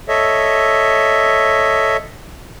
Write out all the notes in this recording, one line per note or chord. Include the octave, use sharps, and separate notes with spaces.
A4 C#5 D#5 E5